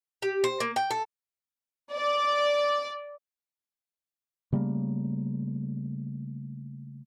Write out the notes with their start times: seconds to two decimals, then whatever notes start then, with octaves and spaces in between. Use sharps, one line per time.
0.22 G4
0.44 C5
0.60 A#3
0.76 G5
0.91 A4
1.92 D5
4.52 C#3 G3 A3 A#3